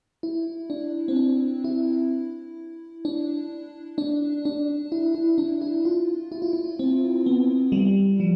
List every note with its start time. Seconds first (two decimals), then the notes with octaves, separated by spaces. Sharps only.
0.23 E4
0.70 D4
1.08 C4
1.16 D4
1.64 E4
3.05 D4
3.98 D4
4.45 D4
4.92 E4
5.15 E4
5.38 D4
5.62 E4
5.85 F4
6.32 E4
6.42 F4
6.53 E4
6.79 C4
7.26 B3
7.72 G3
8.20 F3